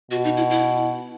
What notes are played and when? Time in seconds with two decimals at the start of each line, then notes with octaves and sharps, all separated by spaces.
0.11 B2 F#4
0.24 D#4
0.37 E4
0.50 E4